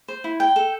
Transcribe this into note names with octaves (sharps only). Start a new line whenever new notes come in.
C5
E4
G5
A4